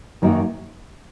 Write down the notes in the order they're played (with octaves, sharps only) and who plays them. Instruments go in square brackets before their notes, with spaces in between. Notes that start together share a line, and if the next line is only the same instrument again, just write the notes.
[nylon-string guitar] F#2 D#3 F#3 A#3 D#4